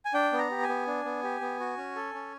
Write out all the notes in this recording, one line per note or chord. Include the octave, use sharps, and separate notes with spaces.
G#5
D4 G5
B3
A#5
G4
G#5
B3
D4
B3
G4
B3
F#4
C#4
A4
C#4